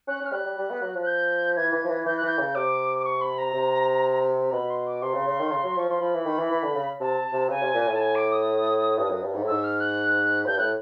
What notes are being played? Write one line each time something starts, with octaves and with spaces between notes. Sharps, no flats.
C#4 F#6
C#4
F6
G3 F#6
G3
G3
B3
F#3
F3
F#6
G6
E3 G#6
E3
F3
E3
E3 G6
F#6
E3 G6
C#3
C3 D6
D6
C#6
B5
A#5
C3
A#5
B2 B5
C6
D6
C3 C6
C#3
C#3
D#3
C#3
F#3
F3 C#6
F3 C6
F3 B5
E3
D#3
E3
E3
D3
C#3
C3 A5
C3
C#3 G#5
C3
A#2
A2
A5
G#5
D6
D#6
G2
F#2
G2
G#2
A2
G#2 E6
F6
F#6
G2 G6
A2 F#6